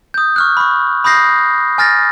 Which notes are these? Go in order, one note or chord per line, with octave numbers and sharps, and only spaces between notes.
D#6 G6
C#6 F6 F#6
B5 C#6
B5 D#6 G6 A#6 C7
G#5 F6 A6 A#6